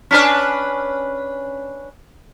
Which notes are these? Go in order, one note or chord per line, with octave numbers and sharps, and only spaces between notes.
C#4 D4 B4